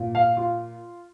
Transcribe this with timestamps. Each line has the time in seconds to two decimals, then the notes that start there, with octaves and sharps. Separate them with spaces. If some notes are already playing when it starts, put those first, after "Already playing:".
Already playing: A#2
0.15 F5
0.37 F4